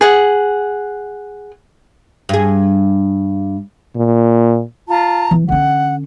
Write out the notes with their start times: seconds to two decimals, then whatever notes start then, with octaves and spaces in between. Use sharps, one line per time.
0.01 G#4 F#5
2.29 G2 G#4
3.96 A#2
4.88 F4 A5 A#5
5.31 E3
5.49 D3 C#4 F#5